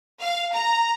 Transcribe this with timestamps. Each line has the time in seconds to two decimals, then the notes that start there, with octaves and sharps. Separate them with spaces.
0.21 F5
0.55 A#5